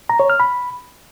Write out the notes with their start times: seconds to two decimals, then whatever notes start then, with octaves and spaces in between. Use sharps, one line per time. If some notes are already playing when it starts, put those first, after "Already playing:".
0.09 A#5
0.20 C#5
0.30 F6
0.40 B5